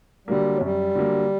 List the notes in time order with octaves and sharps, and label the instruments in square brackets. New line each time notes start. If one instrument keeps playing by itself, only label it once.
[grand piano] D3 F#3 A#3 [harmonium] G3
[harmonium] F#3
[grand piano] F#2 [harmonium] G3
[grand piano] D3 F#3 A#3